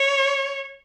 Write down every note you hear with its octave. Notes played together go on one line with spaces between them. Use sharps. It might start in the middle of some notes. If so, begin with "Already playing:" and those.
Already playing: C#5